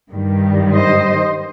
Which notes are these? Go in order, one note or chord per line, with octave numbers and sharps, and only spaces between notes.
G2 D#3 G3
C5 D#5